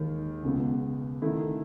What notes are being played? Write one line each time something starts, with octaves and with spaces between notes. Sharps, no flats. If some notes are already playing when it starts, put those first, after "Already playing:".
Already playing: D#2 D#3 G#3 D#4
C#2 B2 G#3 B3
D#3 A3 E4